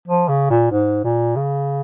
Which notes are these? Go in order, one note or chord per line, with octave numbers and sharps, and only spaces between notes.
F3
C#3
A#2
G#2
A#2
C#3